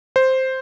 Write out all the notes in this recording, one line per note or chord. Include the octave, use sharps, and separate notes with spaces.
C5